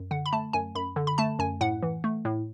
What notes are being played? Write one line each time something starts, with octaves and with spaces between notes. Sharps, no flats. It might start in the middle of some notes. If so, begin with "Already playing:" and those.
Already playing: F#2
D3 F#5
B5
A3 A5
F#2 G#5
F#2 B5
D3
B5
A3 A5
F#2 G#5
A2 F#5
E3
A3
A2